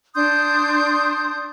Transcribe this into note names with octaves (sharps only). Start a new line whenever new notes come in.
D4 C6 D#6 G6